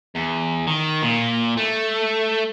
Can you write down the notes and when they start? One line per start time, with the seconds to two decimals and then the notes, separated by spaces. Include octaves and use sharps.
0.15 E2
0.67 D#3
1.03 A#2
1.57 A3